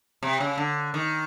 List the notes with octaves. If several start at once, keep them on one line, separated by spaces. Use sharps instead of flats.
C3
C#3
D3
D#3